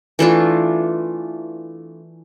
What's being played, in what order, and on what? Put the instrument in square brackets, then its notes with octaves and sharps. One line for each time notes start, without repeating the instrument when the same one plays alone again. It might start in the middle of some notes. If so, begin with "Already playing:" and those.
[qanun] E3 A3 D4 F4